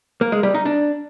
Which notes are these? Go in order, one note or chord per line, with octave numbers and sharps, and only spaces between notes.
A#3
G#3
G3
D#4
D4